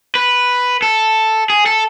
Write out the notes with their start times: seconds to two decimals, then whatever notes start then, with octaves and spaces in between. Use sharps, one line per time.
0.15 B4
0.82 A4
1.50 G#4
1.66 A4